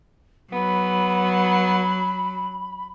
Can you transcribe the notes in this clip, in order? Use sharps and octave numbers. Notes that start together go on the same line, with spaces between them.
F#3 B3 B5